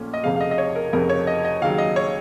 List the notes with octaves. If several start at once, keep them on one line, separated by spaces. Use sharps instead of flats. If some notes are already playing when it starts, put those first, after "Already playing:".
Already playing: A#1 A#2 A3 C#4
D#5
F1 F2 C#3 F5
F5
D#5
D#5
C#5
A#4
F1 F2 C#3 A#4
C#5
D#5
D#5
D#2 C#3 F#3 F5
D#5
C#5